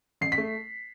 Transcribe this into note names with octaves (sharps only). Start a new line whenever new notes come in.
A1 C7
B6
A3